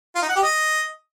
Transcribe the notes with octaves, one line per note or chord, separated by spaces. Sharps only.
F4
D#4
F#5
G4
D#5